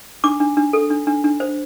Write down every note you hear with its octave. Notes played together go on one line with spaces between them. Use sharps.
D4 D6
D4
D4
A4
D4
D4
D4
C5